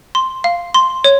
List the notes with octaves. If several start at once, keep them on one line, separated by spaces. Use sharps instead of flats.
C6
F5
C6
C#5